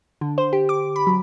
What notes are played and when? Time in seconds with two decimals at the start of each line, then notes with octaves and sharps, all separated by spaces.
0.21 D3
0.38 C5
0.53 G4
0.69 D6
0.96 B5
1.07 F#3